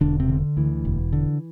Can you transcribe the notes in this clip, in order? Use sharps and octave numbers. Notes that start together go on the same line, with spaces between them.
E1 D3 D4
C3 C4
D3
D2 E3
E1
D3